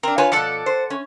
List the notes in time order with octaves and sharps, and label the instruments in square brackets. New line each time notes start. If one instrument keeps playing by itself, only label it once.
[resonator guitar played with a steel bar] C4 D4 [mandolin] A#4
[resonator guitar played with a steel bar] F4 C#5 G#5 [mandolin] B4
[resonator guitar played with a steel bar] B2 F3 [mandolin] A4 D5 F#5
[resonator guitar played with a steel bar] C5
C#4